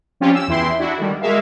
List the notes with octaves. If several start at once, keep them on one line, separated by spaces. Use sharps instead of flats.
F3 G3 C4 C#4 F4 G4
E6
E2 E3 E4 G5 C6
D4 E4 F#4
D3 D#3 G3
G#3 F#4 G#4 A#4 E5 F5